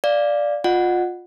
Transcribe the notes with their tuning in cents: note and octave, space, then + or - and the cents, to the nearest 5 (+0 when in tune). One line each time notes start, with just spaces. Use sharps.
D5 +0 F5 +0
F4 +20 D#5 -45 F#5 +0